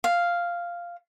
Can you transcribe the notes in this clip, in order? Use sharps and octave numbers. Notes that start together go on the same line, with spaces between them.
F5